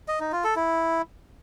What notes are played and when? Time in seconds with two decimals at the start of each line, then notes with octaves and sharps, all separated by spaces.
0.08 D#5
0.20 D#4
0.32 F4
0.44 A4
0.56 E4